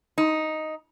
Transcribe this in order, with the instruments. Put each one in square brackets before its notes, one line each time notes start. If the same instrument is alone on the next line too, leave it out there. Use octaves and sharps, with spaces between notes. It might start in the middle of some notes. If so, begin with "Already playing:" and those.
[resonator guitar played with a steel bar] D#4